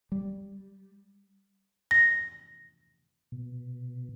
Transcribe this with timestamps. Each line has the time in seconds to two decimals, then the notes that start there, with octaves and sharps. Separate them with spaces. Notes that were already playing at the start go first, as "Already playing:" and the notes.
0.12 G3
1.91 A#6
3.32 B2